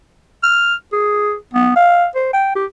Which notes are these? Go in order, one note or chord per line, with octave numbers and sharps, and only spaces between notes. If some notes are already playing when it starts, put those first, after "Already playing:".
F6
G#4
B3
F5
C5
G5
G4